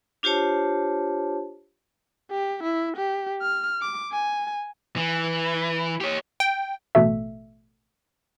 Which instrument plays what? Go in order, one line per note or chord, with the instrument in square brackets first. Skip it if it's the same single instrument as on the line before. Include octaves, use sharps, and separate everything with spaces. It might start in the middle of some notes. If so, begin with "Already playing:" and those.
[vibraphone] D4 F4 G4 C5 C#5 A5
[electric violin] G4
E4
G4
F6
D6
G#5
[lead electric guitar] E3
G4 C#5
[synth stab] G5
[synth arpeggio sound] A1 B2 A3 E5